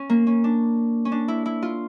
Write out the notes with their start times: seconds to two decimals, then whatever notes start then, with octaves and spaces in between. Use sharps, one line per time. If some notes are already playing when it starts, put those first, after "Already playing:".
Already playing: C#4
0.10 A#3
0.27 C#4
0.44 D4
1.05 C#4
1.12 D4
1.28 E4
1.46 E4
1.63 F4